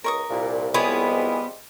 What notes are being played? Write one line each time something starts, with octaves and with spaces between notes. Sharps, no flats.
C#2 A#4 C#6 D#6
C2 A#2
F3 G3 G#3 B3 E4 G#4 C#5